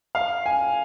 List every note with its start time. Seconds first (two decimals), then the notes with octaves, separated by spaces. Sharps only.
0.15 F5
0.46 G#5